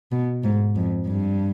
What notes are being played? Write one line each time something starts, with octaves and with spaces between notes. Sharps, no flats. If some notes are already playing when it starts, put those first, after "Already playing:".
B2
G#2
F2
G2